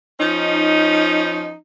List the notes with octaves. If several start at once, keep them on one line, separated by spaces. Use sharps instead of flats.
F3 C#4 D#4